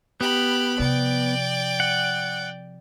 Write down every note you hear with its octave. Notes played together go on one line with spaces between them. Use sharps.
B3 G4 B5
C3 F3 D5 G5
F#5